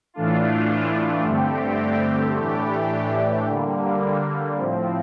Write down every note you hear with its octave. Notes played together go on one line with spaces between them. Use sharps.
A2 E3 A3 D4 F4
G2 D3 A3 C4 G4
A2 E3 A3 D4 G4
D3 G3 A#3
A2 F3 C4